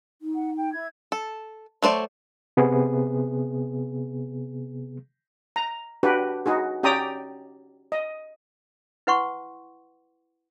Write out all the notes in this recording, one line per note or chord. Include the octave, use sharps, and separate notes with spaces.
D#4
F#5
G5
E4 G#6
A4
F#3 A3 C5 D5
C3 B3 G#4
A#5
D4 F#4 G4 B4
D#4 F#4 G#4
C#4 G4 D5 G5 A#5 D#6
D#5
E4 B4 F#5 C6 C#6